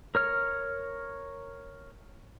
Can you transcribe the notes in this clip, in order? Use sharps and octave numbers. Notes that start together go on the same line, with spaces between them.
A#4 C#5 F6